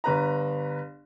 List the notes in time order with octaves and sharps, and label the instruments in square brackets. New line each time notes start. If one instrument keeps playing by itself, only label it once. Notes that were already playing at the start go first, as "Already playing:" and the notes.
[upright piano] G1 B4 A#5